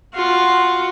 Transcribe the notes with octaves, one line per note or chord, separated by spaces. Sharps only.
F4 F#4